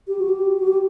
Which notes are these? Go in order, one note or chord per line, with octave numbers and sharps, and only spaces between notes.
G4
F#4
G4
F#4
G4